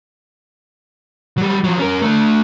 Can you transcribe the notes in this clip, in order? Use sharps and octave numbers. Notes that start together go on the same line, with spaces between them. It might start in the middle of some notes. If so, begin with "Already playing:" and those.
F#3 G3
F3 F#3
C#4 A#4
A3 D4